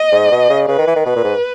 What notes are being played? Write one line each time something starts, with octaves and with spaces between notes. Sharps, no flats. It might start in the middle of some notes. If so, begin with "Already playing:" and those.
Already playing: D#5
G#2
B2
C#3
C#3 B4
D#3
E3
D#3
B2 B4
A#2
G#2